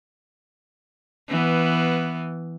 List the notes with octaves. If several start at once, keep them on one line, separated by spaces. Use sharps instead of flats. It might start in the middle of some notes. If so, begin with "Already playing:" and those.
E3 B3